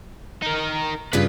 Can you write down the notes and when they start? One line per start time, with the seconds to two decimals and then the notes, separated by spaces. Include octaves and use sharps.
0.42 D#4 A#4
1.13 G2 C#3 F4 B4 B5